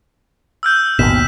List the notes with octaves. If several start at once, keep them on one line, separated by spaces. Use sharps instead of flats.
E6 F6 G6
G#1 D#2 B2 B6 E7